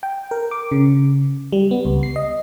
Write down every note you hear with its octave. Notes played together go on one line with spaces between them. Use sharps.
G5
A#4
D6
C#3
G3
B3
C#2
C7
D#5